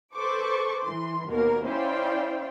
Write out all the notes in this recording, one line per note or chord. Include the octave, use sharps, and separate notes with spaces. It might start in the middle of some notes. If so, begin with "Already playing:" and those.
A4 B4 C5 C#6 D6
E3 C6
D#2 B2 A#3 A#4
C#4 E4 C5 D5 F5 G5